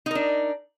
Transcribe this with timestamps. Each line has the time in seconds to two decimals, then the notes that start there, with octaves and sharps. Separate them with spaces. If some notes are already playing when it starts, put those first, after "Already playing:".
0.06 D#4
0.11 A#4
0.15 D4